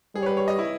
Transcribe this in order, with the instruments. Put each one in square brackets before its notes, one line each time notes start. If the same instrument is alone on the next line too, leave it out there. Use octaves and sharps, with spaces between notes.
[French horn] G3 [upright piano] G#4
[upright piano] C#5
B4
C#5
D#5
E4